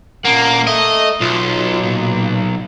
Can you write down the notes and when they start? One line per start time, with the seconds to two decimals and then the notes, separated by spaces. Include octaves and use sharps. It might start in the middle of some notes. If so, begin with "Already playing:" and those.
0.25 A#2 A#3 C#4 F#5
0.67 A4 D#5 E5
1.21 B1 F4
1.83 A#2